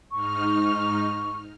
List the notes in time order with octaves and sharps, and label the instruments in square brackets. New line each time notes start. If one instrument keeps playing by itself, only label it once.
[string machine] G#2 D#4 F6 [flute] C#6